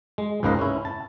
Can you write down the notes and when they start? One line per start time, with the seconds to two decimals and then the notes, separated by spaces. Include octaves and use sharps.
0.18 G#3
0.43 C#2 G#2 A#3 B4 C5 D#5
0.59 C#4 E4
0.85 A5